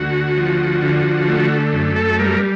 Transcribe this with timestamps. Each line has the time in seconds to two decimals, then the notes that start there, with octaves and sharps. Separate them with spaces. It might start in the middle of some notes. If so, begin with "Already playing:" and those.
Already playing: D2 F#4
0.37 F3
0.82 D3
1.28 A3
1.73 F#2
1.96 A4
2.18 G3 A#4